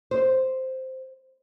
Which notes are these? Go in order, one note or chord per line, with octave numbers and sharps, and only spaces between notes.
C5